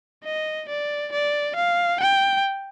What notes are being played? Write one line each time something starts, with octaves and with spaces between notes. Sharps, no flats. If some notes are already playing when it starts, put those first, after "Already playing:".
D#5
D5
D5
F5
G5